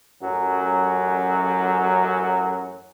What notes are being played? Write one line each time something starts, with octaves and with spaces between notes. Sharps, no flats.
A1 F#2 F#3